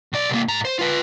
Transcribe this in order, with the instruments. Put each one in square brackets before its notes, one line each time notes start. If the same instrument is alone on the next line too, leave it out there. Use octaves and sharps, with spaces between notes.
[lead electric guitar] B1 D5
C2 A#3
G#2 A#5
C5
F4 B4